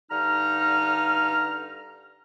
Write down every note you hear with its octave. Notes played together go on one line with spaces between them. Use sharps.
G2 D3 D#4 A#5 F6